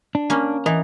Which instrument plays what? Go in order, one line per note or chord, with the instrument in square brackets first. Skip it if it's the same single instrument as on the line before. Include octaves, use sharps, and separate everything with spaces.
[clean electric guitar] D4
[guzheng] A#3 C#4
[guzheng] E3 [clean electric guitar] A#4 D#5